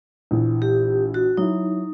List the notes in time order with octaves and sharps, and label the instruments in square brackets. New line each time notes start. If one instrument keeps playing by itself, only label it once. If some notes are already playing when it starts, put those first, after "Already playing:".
[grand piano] A#1 E3
[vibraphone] G4
F#4
[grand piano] F#3 E4 [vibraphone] D#4